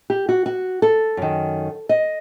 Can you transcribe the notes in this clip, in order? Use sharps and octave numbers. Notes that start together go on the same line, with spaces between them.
G4
F#4
F#4
A4
F#2 D#3
D#5